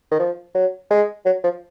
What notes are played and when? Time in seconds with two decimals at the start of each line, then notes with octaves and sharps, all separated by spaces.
0.11 D#3
0.20 F3
0.55 F#3
0.91 G#3
1.26 F#3
1.44 F3